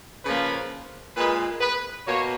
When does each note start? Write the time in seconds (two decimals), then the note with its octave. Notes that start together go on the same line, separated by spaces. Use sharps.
0.25 C#3 F3 A#3 B4
1.16 A#2 G#3 B4
1.61 B4
2.06 B2 A#3 C#5